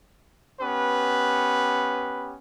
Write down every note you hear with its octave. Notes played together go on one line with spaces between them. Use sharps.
B3 C#4 G4 B4